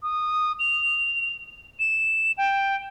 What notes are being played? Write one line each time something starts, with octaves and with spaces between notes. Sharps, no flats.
D#6
F7
E7
G5